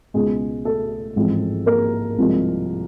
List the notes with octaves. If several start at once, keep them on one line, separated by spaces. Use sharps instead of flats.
C#2 B2 G#3 B3 G#4
A3 A4
A1 G#2 F3 G#3 C4
A#3 A#4
C2 C3 F3 G#3